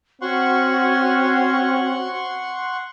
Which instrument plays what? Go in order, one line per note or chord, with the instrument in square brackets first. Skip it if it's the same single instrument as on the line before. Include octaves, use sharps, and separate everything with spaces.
[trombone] C4 [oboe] C#4 [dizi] F#4 [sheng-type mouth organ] F#5 C6 C#6